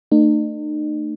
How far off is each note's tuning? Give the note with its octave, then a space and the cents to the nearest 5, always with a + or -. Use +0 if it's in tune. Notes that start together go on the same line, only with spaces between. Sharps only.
A3 +30 D#4 -45